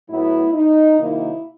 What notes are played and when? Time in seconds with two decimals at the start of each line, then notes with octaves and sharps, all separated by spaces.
0.09 A2 F#3 B3 E4
0.53 D#4
0.98 C3 D#3 F#3 A#3 D#4 E4